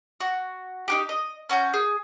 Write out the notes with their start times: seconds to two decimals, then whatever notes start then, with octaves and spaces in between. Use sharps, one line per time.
0.20 F#4
0.88 D#4 F#4 G4
1.09 D#5
1.49 C#4 F#4 E6 G6
1.74 G#4